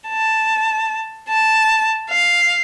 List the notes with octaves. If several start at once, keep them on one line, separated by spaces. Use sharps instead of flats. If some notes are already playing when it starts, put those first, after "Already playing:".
A5
A5
F5